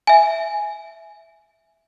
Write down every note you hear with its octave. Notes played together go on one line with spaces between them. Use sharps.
E5 G#5